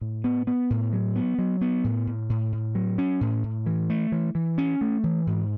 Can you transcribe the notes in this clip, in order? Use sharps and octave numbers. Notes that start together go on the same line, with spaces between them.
A2
B3
B3
A2
F#3
B3
F#3
B3
A2
A2
A2
A2
F#3
C#4
A2
A2
E3
A3
E3
E3
C#4
A3
E3
G#2